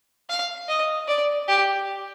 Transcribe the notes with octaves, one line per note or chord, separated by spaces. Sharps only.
F5
D#5
D5
G4